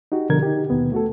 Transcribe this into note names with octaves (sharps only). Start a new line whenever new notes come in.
D#4 F#4 G4
B2 D3 F3 A#4 G#6
D#4 G4
D#2 B2 B3
A3 F#4 A4